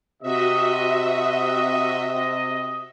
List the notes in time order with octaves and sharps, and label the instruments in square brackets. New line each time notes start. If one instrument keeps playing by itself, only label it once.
[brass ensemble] C3 D#5 [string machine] F#4 E5